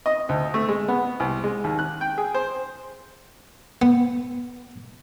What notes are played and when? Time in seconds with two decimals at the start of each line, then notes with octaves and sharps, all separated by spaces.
0.06 D#5
0.29 D2
0.54 A3
0.68 G#3
0.88 B3
1.20 C2
1.44 G#3
1.64 D#2
1.79 F#6
2.01 G5
2.18 G#4
2.34 C5
3.82 B3